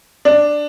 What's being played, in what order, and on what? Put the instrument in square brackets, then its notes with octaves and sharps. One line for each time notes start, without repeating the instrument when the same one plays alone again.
[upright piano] D4